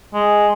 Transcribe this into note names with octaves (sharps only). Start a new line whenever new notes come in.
G#3